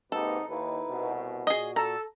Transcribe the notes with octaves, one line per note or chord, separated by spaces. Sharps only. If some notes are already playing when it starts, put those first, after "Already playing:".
G#2 C3 A#3 D#4 G4 A4 B4
D#2 D#4 E4 B4
C2 B2
A#2 F#4 G#4 D#5
A4 A#5